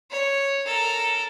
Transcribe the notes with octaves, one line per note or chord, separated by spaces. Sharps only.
C#5
A4 A#4